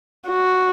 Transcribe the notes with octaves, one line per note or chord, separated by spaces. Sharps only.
F#4